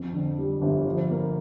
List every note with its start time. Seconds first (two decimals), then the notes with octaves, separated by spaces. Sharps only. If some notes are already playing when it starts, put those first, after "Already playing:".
Already playing: F2
0.13 D3
0.38 G3
0.62 G1
0.85 F3
1.10 A#3